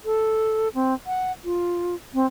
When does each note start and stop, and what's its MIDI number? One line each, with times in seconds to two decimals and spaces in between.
0.05 0.69 69
0.75 0.94 60
1.07 1.32 78
1.45 1.95 65
2.14 2.26 60